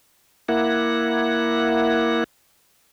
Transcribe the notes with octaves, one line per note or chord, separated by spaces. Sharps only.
A#3 E4 F#5